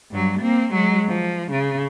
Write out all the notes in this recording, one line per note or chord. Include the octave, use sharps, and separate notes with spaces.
G2 F#3
A#3 C4
F#3 G#3
F3
C#3